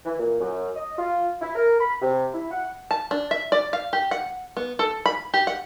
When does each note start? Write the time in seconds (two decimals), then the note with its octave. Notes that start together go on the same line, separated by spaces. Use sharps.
0.05 E3
0.18 A#2
0.40 F#2
0.76 D#5
0.97 F4
1.41 E4
1.55 A#4
1.79 B5
2.02 C3
2.33 E4
2.51 F#5
2.91 A5
3.11 D4
3.31 E5
3.52 D5
3.73 F5
3.93 G4
4.11 F#5
4.57 B3
4.79 A4
5.06 B5
5.34 G4
5.47 F#5